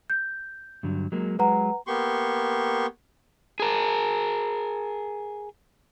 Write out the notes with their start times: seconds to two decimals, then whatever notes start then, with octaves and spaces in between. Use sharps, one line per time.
0.10 G6
0.83 G2 D3 F#3
1.12 F#3 G#3 A#3
1.39 F#3 G#3 B4 F#5 A#5
1.87 A#3 B3 G4 C6 C#6
3.60 G#4 A#4